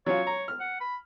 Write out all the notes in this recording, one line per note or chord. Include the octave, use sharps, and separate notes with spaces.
F#3 C#4 F4 C#5
A#5
F6
F#5
B5